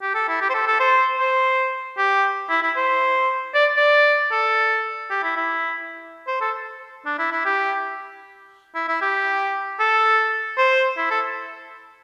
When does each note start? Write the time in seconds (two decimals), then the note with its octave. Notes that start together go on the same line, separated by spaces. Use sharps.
0.02 G4
0.15 A4
0.28 E4
0.41 G4
0.50 C5
0.54 A4
0.67 A4
0.80 C5
1.19 C5
1.98 G4
2.50 E4
2.62 E4
2.76 C5
3.54 D5
3.77 D5
4.32 A4
5.11 G4
5.23 E4
5.37 E4
6.28 C5
6.41 A4
7.06 D4
7.19 E4
7.32 E4
7.46 G4
8.75 E4
8.89 E4
9.02 G4
9.80 A4
10.58 C5
10.97 E4
11.11 A4